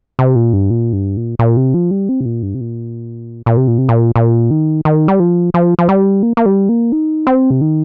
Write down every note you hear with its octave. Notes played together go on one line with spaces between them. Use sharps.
C3
A#2
G2
A#2
G2
A#2
A#2
C3
F3
G3
C4
C3
A#2
G2
C3
A#2
A#2
C3
A#2
C3
A#2
A#2
D#3
D#3
G3
F3
F3
F3
G3
A#3
A#3
G3
A#3
D#4
C4
C3
D#3